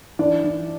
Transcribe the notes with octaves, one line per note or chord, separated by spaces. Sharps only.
E3 D4 D5
E3